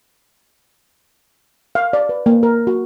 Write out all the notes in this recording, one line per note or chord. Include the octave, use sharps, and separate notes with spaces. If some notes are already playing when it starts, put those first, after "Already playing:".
F5
D5
B4
A#3
A#4
F#4